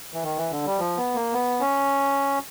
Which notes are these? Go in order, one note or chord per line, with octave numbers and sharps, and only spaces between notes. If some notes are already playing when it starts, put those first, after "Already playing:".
E3
D#3
E3
D3
G3
F3
B3
A#3
B3
C#4